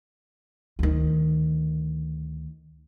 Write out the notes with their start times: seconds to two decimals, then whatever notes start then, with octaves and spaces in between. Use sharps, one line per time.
0.79 D2 D#3